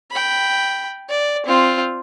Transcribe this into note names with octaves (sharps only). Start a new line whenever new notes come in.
G5 B5
D5
C4 F4